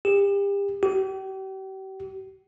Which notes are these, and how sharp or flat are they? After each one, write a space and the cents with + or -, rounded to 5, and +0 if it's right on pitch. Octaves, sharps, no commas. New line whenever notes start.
G4 +35
G4 -40